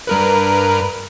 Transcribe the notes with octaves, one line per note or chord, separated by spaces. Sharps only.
G2 A#4 B4